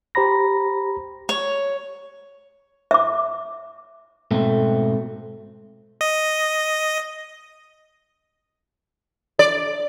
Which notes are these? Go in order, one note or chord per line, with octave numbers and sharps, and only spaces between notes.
G4 C5 A#5 B5 A#6
C#5
E5 D6
G#2 B2 A3 C4
D#5
D5